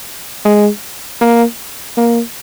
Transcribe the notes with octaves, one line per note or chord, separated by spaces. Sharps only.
G#3
A#3
A#3